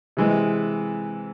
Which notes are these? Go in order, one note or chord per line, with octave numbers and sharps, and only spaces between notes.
C3 E3 G#3